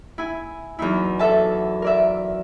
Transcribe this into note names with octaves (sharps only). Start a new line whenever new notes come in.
E4 G#5
E2 F#3 D#4 E4
D4 F#4 A4 E5 A5
A#4 D5 E5